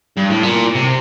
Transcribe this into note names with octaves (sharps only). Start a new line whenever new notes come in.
G2
A2
A#2
C3